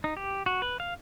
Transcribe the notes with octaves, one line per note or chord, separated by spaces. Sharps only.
D#4
G4
F#4
B4
F5